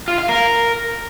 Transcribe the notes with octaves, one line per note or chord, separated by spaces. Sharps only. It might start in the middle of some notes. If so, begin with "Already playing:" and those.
F4
F5
A#4